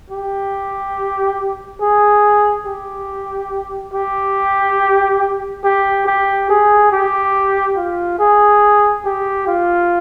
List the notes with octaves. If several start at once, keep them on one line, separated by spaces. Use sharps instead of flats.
G4
G#4
G4
G4
G4
G4
G#4
G4
F4
G#4
G4
F4